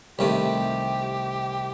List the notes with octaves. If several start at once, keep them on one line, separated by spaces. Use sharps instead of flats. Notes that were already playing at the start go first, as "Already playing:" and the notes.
C2 C3 D#3 A3 G4